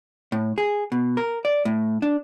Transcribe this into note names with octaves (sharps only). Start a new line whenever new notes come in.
A2
G#4
B2
A#4
D5
A2
D4